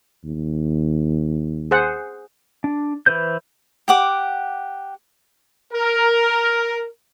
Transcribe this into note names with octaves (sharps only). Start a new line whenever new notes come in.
D#2
G#4 C5 F#5
D4
E3 E4 B4 C5 G6
G4 F#5 D6
A#4